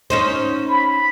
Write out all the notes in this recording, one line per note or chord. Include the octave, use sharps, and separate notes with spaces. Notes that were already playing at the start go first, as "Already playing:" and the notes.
C#4 D#4 C5
B5